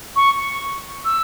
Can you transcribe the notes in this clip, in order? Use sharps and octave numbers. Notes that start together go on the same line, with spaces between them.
C#6
E6